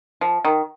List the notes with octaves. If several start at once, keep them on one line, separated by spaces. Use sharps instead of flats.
F3
D#3